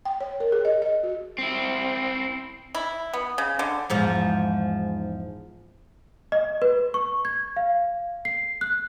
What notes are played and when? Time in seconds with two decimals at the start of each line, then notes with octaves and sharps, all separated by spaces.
0.05 G5
0.21 C#5
0.40 A#4
0.52 G#4
0.65 D#5
0.82 D#5
1.03 F#4
1.38 C4 E4
2.75 E4
3.13 B3
3.38 C#3
3.59 D3
3.90 E2 G#2 F3
6.32 D#5
6.62 B4
6.94 C#6
7.25 G#6
7.57 F5
8.25 C7
8.61 F#6